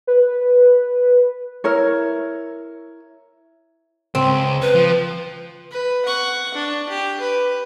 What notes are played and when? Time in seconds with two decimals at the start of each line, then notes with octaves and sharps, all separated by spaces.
0.07 B4
1.64 E4 A#4 C#5
4.15 C#2 C4
4.62 B4
4.74 F3
5.71 B4
6.05 F#5 C#6
6.54 D4
6.90 G4
7.20 B4